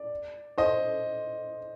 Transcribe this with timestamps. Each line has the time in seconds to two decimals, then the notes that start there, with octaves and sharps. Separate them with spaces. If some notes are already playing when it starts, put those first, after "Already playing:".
Already playing: D5
0.58 C5 D#5